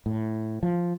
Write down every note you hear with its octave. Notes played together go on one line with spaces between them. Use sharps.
A2
F3